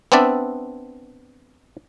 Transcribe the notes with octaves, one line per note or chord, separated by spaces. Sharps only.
B3 C4 D4 D5 E5